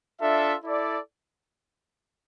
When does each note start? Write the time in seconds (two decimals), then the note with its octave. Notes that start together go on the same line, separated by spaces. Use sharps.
0.19 D4 F4 A4 E5
0.63 E4 A4 D5